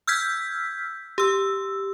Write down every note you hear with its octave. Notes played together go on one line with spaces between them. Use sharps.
E6 F6 G6 G#6 B6
G4 E6